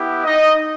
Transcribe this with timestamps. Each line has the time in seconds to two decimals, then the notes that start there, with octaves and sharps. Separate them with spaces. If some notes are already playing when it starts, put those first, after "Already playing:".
Already playing: B3 E4 G4
0.24 D#4 D#5